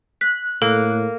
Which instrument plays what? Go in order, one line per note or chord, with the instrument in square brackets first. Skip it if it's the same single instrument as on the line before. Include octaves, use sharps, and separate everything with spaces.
[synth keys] F#6 [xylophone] B6
[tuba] A2 [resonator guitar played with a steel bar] A#3 [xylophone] A4